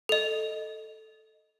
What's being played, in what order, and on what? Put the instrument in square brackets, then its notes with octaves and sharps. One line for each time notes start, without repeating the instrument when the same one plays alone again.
[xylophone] A4 D#5